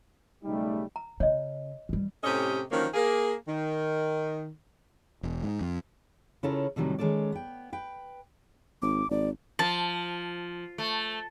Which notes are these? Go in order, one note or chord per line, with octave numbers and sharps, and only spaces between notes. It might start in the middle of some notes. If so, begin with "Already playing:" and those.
B1 C#3 G3 A3 D#4
A#5
C#3 C#5 D#5
E3 G3
A2 C3 C#4 G4 A4 D#5
D3 D#3 F3 F#3 A#3 C#4
A#3 G#4
D#3
E1
G#2
F2
C#3 C#4 E4 F4 A4 A#4
A2 C3 D#3 F#3 G3
D#3 G#3 C#4 A4 D5
B3 G5
B4 G5
G#1 D6
G#1 D5
F3 A5
A3